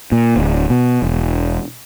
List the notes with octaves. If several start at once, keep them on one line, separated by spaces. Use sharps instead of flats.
A#2
D1
B2
E1